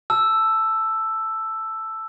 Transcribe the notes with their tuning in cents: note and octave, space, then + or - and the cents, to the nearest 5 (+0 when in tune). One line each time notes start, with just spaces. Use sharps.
A5 +0 E6 +5